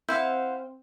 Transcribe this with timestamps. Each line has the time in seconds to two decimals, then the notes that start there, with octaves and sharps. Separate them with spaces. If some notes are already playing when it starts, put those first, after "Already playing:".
0.09 C4 E4 C5 F5 F#5 G6